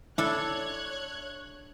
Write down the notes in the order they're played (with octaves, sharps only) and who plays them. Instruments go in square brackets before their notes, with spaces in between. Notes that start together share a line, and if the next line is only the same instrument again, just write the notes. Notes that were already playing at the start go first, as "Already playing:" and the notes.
[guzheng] D4 A4 [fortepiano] E4 [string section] C#5 F#6 G#6